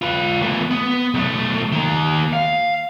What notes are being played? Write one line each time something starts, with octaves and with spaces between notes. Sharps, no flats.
F4 B4
A3 B3
B3
B1 A3
D#3 A#3
F5